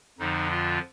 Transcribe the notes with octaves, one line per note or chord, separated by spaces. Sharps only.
F2 D3 F3 D#4
F4